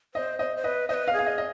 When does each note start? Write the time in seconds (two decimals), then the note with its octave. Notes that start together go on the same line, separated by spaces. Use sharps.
0.15 C5 D#5
0.39 C5 D#5
0.57 C5
0.64 B4 D#5
0.89 C5 D#5
0.94 B4
1.08 F5
1.13 G#4
1.19 F5
1.26 D#5
1.38 D#5